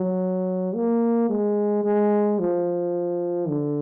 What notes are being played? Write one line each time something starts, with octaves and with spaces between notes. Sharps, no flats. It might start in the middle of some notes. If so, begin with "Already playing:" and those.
Already playing: F#3
A#3
G#3
G#3
F3
D3